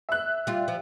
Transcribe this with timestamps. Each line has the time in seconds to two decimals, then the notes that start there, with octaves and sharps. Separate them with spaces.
0.09 E5 F#6
0.47 G3 F4
0.68 F3